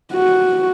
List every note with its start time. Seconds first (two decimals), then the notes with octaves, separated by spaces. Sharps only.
0.13 F#4